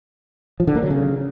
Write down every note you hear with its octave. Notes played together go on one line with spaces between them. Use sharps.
F3
D3
A#3
F#3
C#3